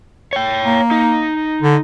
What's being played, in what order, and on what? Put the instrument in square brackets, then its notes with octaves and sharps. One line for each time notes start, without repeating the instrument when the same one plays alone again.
[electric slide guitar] C#5 G5
[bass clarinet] A#3
[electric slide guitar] D#4
[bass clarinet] D3